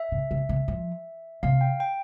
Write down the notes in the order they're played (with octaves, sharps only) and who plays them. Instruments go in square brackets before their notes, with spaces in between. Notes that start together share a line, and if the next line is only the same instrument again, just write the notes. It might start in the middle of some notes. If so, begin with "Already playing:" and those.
Already playing: [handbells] E5
[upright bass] C#3
C#3
C#3
F3
[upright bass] C3 [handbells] F5
[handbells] G5
G5